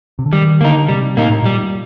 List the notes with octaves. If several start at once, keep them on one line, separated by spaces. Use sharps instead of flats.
C3
D3
D#3 G3
D3 A#3 D#4
C3 G3
A#2 A#3 D#4
A2
A#2 G3